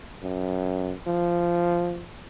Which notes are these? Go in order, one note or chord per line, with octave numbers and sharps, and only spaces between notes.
F#2
F3